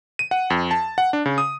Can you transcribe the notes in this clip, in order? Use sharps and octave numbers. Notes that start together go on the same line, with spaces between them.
D#7
F#5
F2
A5
F#5
D4
C#3
D#6